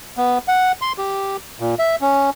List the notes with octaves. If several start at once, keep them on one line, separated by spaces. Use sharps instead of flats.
B3
F#5
C6
G4
A#2
E5
C#4